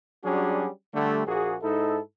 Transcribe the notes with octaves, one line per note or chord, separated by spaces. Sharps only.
F#3 G3 C#4 D4 F#4 G#4
D3 G3 A3
A#1 A#3 F#4 G#4
G#2 D#4 E4 A4